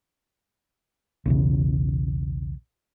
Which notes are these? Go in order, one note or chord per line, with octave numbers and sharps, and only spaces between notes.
B1 E2 C#3